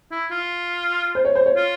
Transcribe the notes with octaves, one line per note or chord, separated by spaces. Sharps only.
E4
F4
C5
C#5
C5
C#5
F4